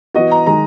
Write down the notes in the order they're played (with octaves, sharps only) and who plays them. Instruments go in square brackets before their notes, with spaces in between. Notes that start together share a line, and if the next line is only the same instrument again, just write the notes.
[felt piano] E3 B3 F#4 [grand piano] D#5
[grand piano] A#5
[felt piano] D#3 G#3 [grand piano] A#5